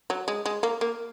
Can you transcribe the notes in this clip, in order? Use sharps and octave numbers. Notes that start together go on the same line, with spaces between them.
F#3
G#3
G#3
A#3
A#3